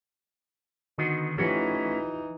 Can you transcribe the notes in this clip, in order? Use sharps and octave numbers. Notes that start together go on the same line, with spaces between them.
D3 D#3 B3 D#4 F#4
E3 F3 A3 C#4 D#4 F#4 G4